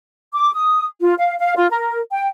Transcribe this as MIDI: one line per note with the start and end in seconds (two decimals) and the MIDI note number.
0.33 0.54 86
0.54 0.85 87
1.01 1.14 65
1.19 1.35 77
1.39 1.53 77
1.57 1.67 65
1.70 1.98 70
2.12 2.27 79